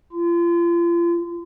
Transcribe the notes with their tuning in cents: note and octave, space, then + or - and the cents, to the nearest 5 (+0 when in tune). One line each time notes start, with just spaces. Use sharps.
F4 -35